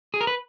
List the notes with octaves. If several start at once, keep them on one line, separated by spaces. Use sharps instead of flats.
G#4
A#4
B4